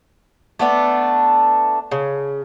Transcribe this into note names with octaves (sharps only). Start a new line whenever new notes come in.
A3 B3 D4
C#3